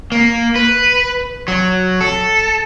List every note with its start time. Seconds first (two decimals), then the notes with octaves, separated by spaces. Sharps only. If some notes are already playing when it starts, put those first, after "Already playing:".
0.12 A#3
0.56 B4
1.48 F#3
2.00 A4